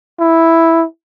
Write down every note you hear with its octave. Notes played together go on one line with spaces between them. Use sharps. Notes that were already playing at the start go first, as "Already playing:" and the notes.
E4